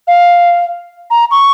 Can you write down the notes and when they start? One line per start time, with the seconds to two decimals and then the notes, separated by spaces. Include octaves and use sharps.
0.08 F5
1.11 A#5
1.31 C#6